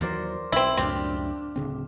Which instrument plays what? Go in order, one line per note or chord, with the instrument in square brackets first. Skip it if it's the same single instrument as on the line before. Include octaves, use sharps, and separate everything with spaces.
[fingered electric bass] D#2 E3 F#3 [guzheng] A#4 C5 D5
[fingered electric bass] B1 [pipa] C4 E4
[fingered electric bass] C#2 F#2 A2 [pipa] C4 [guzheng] D4 F4 G4
[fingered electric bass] D1 C#3 C4